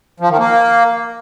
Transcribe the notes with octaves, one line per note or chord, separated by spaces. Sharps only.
F3
D#3
A#3